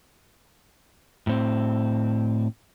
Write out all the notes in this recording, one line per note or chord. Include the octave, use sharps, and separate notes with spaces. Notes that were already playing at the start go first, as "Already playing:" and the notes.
A2 C4